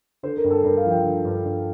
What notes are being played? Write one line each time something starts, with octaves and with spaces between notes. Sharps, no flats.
D3 C5
A#4
G2
A4
G2 A#4
F5
F3
G5
D3
G2
G2